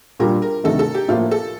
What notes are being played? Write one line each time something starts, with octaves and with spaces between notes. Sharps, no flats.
A#2 G3 D4 G4 A#4
A#4
D2 C3 D#3 A3 A4
A4
G4
A2 F3 A#3 F4
A4